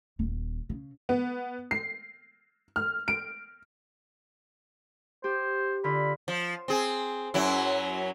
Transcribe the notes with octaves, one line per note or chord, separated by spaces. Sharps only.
D#1
C#3
B3
C7
F6
D7
G4 C5
D3 F4 B5
F3
C4 G#4
F#2 F#3 E4